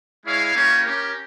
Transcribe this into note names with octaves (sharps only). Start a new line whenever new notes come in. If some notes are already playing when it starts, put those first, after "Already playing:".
G#3 E4 G#4 C#5 F5
A#3 C#4 E4 G4 C#5
C#4 G4 A#4